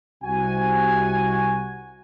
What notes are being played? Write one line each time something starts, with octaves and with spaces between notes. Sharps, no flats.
C2 C3 F#4 G#5